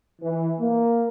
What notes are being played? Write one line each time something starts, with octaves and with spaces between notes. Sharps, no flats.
E3
A#3